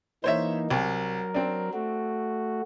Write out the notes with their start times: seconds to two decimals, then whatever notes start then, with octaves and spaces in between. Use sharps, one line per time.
0.24 E3 A#3 D#4 C5 C#5 E5
0.70 C2 F#3 A#4
1.34 C4 D4
1.74 A3 F#4